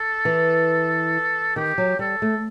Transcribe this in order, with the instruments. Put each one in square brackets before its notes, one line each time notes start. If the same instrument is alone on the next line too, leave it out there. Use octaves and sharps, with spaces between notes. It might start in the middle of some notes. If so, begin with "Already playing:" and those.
Already playing: [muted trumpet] A4
[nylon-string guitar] E3
[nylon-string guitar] D#3 [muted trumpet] G4
[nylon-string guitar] F#3
[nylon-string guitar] G3 [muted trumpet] A4
[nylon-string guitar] A3